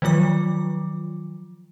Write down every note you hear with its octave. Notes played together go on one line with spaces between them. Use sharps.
D#3 F3 F#3 F4 D6